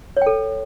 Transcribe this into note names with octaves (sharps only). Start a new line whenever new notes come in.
A4 C#5 G5